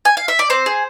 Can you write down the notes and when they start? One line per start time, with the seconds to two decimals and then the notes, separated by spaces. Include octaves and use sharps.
0.05 G#5
0.17 F5
0.28 E5
0.39 D5
0.50 C4 C5
0.66 G#4